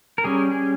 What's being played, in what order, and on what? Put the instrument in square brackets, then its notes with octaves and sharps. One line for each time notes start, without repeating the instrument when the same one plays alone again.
[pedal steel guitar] A#4
G3 C#4 G#4
G#4